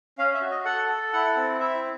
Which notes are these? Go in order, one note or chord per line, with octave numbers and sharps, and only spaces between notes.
C#4 F5
E5
F#4
D#5
A4 F#5
A4
E4 F#5
C4
E4 E5